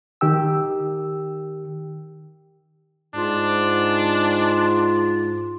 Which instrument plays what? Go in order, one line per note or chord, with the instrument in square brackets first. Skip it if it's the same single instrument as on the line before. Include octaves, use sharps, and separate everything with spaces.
[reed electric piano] D#3 G4 G5 E6
[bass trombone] G#2 [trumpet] D4 [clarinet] F4